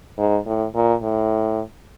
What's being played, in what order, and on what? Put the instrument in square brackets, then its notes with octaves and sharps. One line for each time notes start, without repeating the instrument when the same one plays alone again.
[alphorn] G#2
A2
A#2
A2